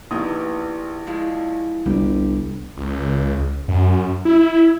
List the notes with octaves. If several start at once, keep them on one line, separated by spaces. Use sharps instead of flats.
A#1 B3 D#4 E4 G4 D#6
F3 G#3 E4
G1 C2 G3 G4
C#2
F#2
E4